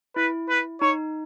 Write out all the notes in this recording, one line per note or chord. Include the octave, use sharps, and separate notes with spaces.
E4 B4
B4
D#4 C#5